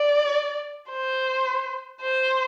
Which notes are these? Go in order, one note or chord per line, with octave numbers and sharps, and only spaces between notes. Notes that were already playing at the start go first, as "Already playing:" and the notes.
Already playing: D5
C5
C5